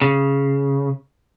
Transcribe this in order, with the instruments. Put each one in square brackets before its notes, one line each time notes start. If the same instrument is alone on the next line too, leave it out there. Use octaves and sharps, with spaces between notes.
[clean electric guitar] C#3